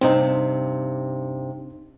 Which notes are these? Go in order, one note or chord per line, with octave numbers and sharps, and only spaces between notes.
G2 C3 C4 D#4